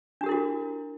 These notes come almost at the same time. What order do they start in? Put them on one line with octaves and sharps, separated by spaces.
D4 G4 A#4 E4 F#4